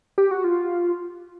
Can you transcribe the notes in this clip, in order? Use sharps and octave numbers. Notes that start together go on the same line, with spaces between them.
G4
F#4
F4